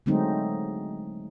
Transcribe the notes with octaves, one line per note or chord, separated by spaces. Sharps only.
D3 F#3 G#3 A3 C4 D#4